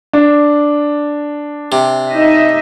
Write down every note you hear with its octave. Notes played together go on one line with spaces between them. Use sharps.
D4
C3
D#4 D#5 E5